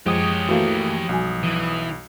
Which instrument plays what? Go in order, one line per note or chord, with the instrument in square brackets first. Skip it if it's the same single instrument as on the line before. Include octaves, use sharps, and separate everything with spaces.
[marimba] F#2 [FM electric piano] F3 D#6 [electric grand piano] G#3 [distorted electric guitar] G4 C#5
[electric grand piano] E3 A3 A#3 [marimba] F#4 F5
[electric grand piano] B1 [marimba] G3 F#4 G#5
[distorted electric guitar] E3